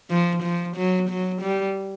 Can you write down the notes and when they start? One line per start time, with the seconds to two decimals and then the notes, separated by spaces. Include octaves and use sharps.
0.10 F3
0.43 F3
0.76 F#3
1.09 F#3
1.41 G3